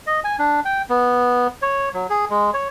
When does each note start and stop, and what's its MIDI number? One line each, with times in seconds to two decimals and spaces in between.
0.07 0.20 75
0.24 0.36 80
0.39 0.60 62
0.65 0.82 79
0.89 1.47 59
1.62 1.89 73
1.94 2.07 54
2.10 2.25 68
2.30 2.50 56
2.54 2.68 73